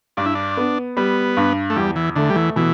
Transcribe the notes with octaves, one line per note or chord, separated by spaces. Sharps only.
G2 D4
E4
D4
B3
G3 B3
G2
A3
E2 G3
E3
D3 A3
G3
E3
B2 E3